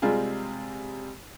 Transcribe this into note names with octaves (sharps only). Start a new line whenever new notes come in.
C3 G3 G#3 C4 F4 G#4